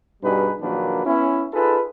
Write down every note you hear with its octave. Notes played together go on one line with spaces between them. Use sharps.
G2 B2 G3 D#4 G#4 B4
A#1 D#3 F#3 A#3 D4 B4
B3 C#4 E4
D#4 F4 G#4 A4 B4